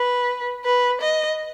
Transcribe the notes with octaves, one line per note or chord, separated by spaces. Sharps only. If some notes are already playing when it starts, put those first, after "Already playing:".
Already playing: B4
B4
D#5